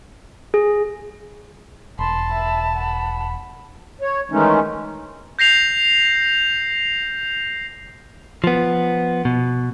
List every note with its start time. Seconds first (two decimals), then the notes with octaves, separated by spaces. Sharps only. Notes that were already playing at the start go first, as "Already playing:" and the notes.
0.54 G#4
1.99 E1 A5 B5 C6
2.31 E5 B5
2.75 F#5 B5
4.01 C#5
4.31 D#3 E3 G#3 A3 C#4 D#4
5.39 G6 A#6 C7 F7
8.44 F3 B3
9.25 B2